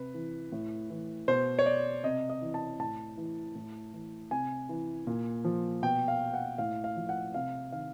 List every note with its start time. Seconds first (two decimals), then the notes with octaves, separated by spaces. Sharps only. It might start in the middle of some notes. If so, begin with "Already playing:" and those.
Already playing: C3 B4
0.14 E3
0.52 A2
0.90 E3
1.28 B2 C5
1.59 C#5
1.66 D5
2.04 C3 D#5
2.30 D#5
2.42 E3
2.54 A5
2.79 A2 A5
3.17 E3
3.55 A2
3.93 E3
4.31 C3 G#5
4.69 E3
5.07 A#2
5.45 F3
5.83 B2 G5
6.08 F5
6.34 F#5
6.58 A2 F5
6.84 F5
6.96 F3
7.09 F#5
7.34 C3 F5
7.72 D#3 F5